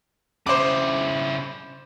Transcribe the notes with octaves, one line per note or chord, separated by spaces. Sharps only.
C#3 E4 C5 D6